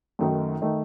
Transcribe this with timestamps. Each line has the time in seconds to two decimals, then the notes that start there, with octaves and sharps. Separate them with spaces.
0.19 F#2 D#3 A3 D#4
0.62 D#3 A3 D#4